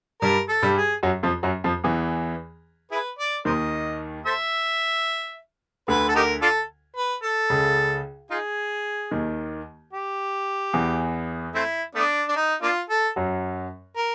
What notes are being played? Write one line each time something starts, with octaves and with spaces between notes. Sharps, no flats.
G2 G3 A#4
A4
G2 G3
G#4
F#2 F#3
F2 F3
F#2 F#3
F2 F3
E2 E3
E4 G#4 B4
D5
D#2 D#3 A#4 C5 D#5
A4 C5 E5
D2 D3 B4
A4
D#4 G4 A#4
D4 F4 A4
B4
A4
C#2 C#3
D#4 F4 G#4
D#2 D#3
G4
E2 E3
A3 C4 E4
A3 B3 D4
D4
D#4
A#3 D4 F4
A4
F#2 F#3
A#4